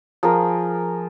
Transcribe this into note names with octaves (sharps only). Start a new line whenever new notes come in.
F3 G#4 A#4